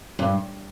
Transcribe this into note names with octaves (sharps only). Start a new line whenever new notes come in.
G2